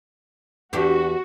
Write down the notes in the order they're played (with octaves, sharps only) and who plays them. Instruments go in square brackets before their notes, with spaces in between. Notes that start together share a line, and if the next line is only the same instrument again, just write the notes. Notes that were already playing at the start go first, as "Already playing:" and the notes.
[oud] E2 D4 G4 [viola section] F#4